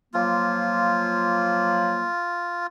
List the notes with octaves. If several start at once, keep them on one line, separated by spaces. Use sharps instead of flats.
F3 F#3 A#3 F4